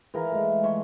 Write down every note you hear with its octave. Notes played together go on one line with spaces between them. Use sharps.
E3 G#4 A#4 F5
G#3 A3
C#5 E5 C6